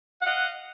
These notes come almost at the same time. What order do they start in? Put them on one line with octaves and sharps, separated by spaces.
F#5 D#5 F5